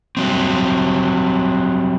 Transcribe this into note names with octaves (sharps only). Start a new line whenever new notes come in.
F#3 G3 C4